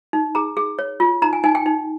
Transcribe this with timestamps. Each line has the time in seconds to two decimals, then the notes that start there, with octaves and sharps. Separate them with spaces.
0.13 D#4
0.35 G#4 A#5
0.57 G#4
0.79 C#5
1.00 F4
1.22 D#4 A#5
1.33 G#5
1.44 D#4 G#5
1.55 G5
1.66 D#4